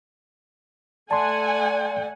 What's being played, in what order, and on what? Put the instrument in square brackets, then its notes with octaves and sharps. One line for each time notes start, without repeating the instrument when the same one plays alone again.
[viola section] A3 F#5 G#5 [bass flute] D5 [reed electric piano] A5 C6